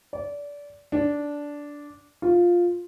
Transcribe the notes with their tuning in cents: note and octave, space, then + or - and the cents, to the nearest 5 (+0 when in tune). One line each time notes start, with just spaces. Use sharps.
D5 -25
D4 -10
F4 +5